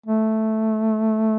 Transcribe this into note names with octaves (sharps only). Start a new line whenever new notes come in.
A3